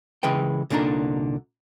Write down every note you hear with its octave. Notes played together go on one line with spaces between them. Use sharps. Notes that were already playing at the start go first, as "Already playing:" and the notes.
C#3 E3 G#3 B4 G5
C2 A#2 D3 D4 D#4 A#4